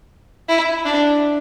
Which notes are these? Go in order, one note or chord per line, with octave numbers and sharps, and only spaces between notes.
E4
D4